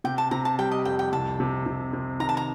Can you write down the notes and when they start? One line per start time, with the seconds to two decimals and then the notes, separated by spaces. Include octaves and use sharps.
0.04 C3 G5
0.18 A5
0.31 C3 A#5
0.45 A5
0.58 G3 G5
0.71 D#5
0.85 F2 G5
0.99 G5
1.12 C2 A5
1.40 C3
1.66 C3
1.93 C3
2.20 D#3 A#5
2.29 A5
2.37 A#5